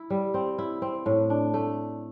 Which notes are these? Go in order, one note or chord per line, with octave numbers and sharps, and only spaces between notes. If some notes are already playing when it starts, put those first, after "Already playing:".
Already playing: E4
G3
C4
E4
C4
A2
D4
A3